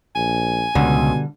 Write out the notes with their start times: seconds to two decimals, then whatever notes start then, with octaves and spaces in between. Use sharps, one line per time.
0.16 A#1 G#5
0.75 C#2 B2 D3 G3